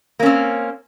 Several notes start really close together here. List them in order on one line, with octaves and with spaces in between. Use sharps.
A#3 C#4 C4